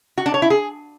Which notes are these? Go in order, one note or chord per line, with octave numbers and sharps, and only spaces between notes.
F#4
D4
C#5
E4
G#4